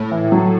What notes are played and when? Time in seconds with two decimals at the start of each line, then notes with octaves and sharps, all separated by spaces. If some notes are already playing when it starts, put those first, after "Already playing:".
Already playing: A2
0.12 E3
0.32 F#3